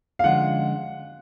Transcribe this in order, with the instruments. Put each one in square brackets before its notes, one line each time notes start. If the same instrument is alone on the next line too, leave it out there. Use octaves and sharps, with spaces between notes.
[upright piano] F5
[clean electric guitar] D3 F3 G#3 C#4 F4 [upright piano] F#5